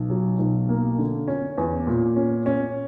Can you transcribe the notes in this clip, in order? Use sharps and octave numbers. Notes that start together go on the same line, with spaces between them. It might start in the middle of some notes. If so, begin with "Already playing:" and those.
Already playing: B1
F#3
B1
A#3
D3
C#4
E2
A#2
C#4
C#4